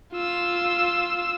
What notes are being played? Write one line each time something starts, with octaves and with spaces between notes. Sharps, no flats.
F4 E6